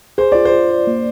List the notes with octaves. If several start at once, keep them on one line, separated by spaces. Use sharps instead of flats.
G#4 C5
F4 D5
C5
F4
D5
A#3